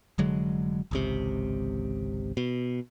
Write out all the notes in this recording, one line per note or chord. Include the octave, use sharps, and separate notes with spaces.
F1 D3 F#3 G#3
G#1 C#2 C3
B2